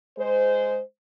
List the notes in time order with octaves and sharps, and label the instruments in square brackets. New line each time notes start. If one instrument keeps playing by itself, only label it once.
[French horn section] G#3 C5